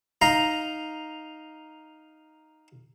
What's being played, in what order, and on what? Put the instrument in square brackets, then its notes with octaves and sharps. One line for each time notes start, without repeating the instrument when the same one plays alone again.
[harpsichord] D#4 F5 A#5